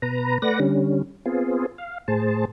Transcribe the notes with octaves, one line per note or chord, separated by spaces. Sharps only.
B2 B4 A#5
A3 B4 D5 F#5 A#6
D3 G3 C#4
B3 C4 F4 G#4
F5
A2 G#4 C5 A5